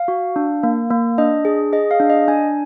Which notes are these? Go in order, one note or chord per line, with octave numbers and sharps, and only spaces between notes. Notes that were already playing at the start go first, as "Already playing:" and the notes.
Already playing: F5
F#4
D4
A#3
A#3
D4 D#5
G#4
G#4 D#5
F5
D4
D#5
D4 G#5